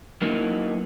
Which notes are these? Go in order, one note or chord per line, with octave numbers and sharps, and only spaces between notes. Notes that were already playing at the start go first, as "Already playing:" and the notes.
F#3 A#3 B3 D#4 E4